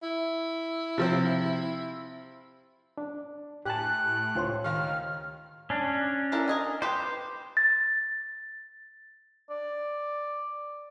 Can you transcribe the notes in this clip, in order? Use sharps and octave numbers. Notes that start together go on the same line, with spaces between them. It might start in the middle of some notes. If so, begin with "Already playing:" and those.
E4
C3 F3 C4
D4
A2 G4 G#5 A5 F#6
C#2 D4 F4 C5 C#5 C6
D#3 G4 F5 F6
C#4 D4
E4 A4 A#4
A#4 D#5 G#5
G4 B4 C5
A6
D5